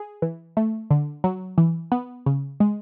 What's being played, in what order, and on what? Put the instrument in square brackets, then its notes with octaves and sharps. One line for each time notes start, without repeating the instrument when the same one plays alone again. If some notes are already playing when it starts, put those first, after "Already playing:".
Already playing: [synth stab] G#4
E3
A3
D3
F#3
E3
B3
C#3
G#3